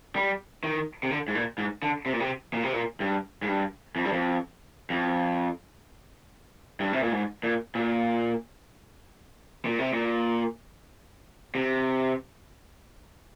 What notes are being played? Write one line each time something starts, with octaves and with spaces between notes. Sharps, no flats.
G3
D#3
C3
D3
G#2
A#2
G#2
D3
C3
A#2
C3
A#2
C3
A#2
G2
G#2
G2
F2
G2
F2
F2
G2
C3
A#2
G#2
A#2
A#2
A#2
C3
A#2
C3